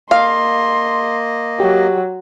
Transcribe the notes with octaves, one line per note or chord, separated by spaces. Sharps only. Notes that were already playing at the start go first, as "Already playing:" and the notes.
A#3 D#5 F5 C6
F#3 G4